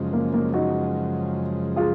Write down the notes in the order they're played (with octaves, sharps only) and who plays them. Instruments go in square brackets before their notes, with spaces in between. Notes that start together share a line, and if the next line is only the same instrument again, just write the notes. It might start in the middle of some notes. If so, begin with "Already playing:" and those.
Already playing: [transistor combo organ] F#2 C#3 F3 G#3
[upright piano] A#3
A#3
D#4 F#4
F4 G#4